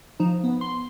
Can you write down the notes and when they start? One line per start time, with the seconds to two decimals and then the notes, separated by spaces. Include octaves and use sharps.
0.20 F3 D#4
0.44 B3
0.61 C6